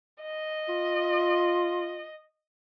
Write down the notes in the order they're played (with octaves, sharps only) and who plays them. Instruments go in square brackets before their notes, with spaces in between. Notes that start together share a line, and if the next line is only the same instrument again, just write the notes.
[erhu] D#5
[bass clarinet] F4